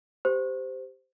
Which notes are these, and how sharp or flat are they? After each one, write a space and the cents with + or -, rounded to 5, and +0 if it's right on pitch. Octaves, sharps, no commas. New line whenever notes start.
G4 +0 C5 -15